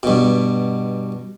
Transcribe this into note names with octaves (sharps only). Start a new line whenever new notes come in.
G2 B2